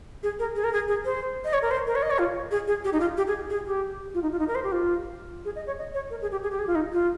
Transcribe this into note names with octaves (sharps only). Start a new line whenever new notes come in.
G#4
A#4
G#4
A#4
G#4
G#4
C5
D#5
C#5
A#4
C5
A#4
C#5
D#5
C#5
F4
G#4
G#4
G4
D#4
F4
G4
G#4
G#4
G4
F4
D#4
F4
D#4
A#4
C5
G4
F4
G#4
D#5
C#5
D#5
C#5
A#4
G#4
G4
G#4
G4
G#4
F4
D#4
F4